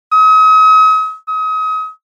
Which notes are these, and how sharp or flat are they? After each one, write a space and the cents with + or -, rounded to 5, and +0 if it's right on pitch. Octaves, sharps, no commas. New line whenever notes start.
D#6 +40
D#6 +35